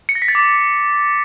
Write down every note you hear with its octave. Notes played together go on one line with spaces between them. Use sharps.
C#7
A#6
B6
A6
D6